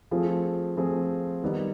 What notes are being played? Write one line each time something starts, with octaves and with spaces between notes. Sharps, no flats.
F3 A3 C4 F4 G#4
F3 A3 C4 F4 G#4
D#3 G3 B3 D#4